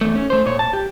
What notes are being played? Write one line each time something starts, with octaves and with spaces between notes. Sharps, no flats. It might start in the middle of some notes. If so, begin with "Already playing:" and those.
E2 A3
C#4
A3 C5
A#2 C#5
A5
G4